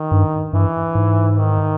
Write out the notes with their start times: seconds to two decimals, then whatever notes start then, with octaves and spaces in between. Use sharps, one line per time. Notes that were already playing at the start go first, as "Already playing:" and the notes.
Already playing: D#3
0.11 G2
0.53 G2 E3
0.95 G#2
1.37 D#3